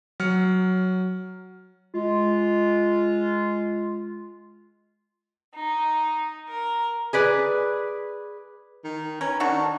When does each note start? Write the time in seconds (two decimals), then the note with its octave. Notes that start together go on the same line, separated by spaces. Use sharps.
0.20 F#3 F6 C#7
1.94 G#3 F4
5.56 D#4
6.49 A#4
7.13 G#4 B4 D5
8.84 D#3
9.21 C#4 A#4 B4
9.40 D#3 D4 F#4 A4